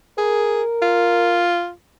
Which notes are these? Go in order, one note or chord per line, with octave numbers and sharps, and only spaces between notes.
G#4 A#4
F4